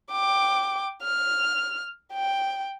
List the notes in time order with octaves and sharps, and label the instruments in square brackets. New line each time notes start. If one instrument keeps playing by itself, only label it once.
[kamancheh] G5 D6
F6
G5